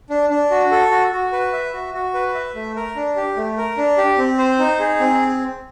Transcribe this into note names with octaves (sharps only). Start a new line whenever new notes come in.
D4
D4
F#4
A4
F#4
F#4
B4
E5
F#4
F#4
B4
E5
A3
A#4
D4
G4
A3
A#4
D4
G4
C4
C5
D#4
G#4
C4